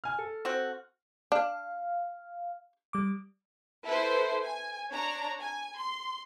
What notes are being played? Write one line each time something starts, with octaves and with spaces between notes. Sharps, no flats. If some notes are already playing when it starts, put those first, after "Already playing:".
G#5 F6
A4
C4 F#4
D4 F5
G3 D6
E4 A4 B4 C5
G#5
D4 C#5 A#5
G#5
C6